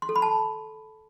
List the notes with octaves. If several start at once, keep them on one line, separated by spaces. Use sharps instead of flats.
C6
A4
B5
A5